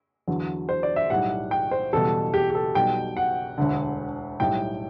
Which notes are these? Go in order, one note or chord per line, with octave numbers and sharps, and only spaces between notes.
E2 D3 F#3
C5
D5
E5
B1 A2 G3 F#5
G5
C5
F#1 E2 B2 G3 A4
G4
G4
A4
B1 B2 G3 G5
F#5
E1 D2 D3
B1 A2 G3 G5